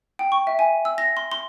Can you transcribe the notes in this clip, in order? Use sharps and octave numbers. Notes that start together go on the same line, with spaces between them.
G5
C#6
E5
G#5
E6
A#6
C6
C6